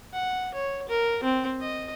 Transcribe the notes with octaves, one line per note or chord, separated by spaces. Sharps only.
F#5
C#5
A#4
C4
D#5